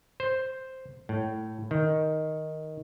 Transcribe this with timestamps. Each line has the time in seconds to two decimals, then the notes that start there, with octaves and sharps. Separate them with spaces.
0.20 C5
1.09 A2
1.71 D#3